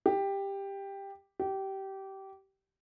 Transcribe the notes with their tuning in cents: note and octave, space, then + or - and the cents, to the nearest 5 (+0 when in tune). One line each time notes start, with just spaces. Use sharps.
G4 +10
G4 -20